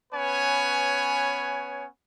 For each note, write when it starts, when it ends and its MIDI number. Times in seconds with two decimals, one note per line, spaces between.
0.13 1.86 59
0.13 1.86 61
0.13 1.86 71
0.13 1.86 73
0.13 1.86 80